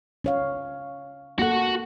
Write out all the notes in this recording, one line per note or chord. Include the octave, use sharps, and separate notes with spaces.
C#4 C#5 F5
A#3 F#4 A4 F#5